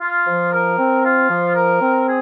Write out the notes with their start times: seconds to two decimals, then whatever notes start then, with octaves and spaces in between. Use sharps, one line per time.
0.01 F4
0.27 F3
0.52 A#4
0.77 C4
1.04 F4
1.29 F3
1.55 A#4
1.80 C4
2.06 G#4